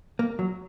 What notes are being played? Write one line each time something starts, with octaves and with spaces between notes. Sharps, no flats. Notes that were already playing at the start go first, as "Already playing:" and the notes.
A#3
F#3